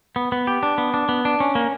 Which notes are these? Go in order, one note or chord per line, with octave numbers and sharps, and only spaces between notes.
B3
B3
G4
D4
B3
D4
B3
D4
C#4
A#3